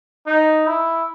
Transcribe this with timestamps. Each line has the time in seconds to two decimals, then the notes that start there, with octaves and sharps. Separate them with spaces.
0.27 D#4
0.67 E4